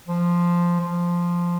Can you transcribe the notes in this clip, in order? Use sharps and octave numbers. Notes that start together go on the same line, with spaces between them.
F3
F3